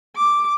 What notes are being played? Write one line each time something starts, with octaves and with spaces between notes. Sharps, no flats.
D6